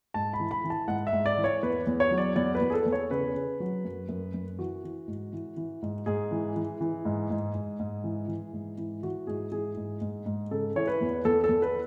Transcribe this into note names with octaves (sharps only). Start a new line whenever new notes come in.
G#2 A5
B5
E3
B5
E3
A5
G#2 F#5
E5
G#2
D5
E3
C#5
E2 B4
E2
C#5
F#3
D5
E2 D5
B4
E2
G#4
A4
E2
C#5
C#3 B4
C#3
F#3
F#2
F#2
F#2
E3 F#4
E3
G#2
E3
E3
G#2
G#2 G#4
E3
E3
E3
G#2
G#2
G#2
G#2
E3
E3
G#2
E3
E3 F#4
G#2 G#4
E3 G#4
G#2
G#2
G#2
C#3 A4
E3 C#5
B4
E2
E2 A4
A4
E2
B4